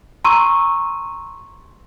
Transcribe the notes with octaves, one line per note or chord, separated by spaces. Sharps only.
A#5 C6 C#6 E6 D#7